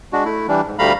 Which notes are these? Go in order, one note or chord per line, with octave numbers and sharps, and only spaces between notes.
G#3 D4 F#4
A3 E4
E3 G3 D4
G#2
D2 G3 A3 F5 A#5 B5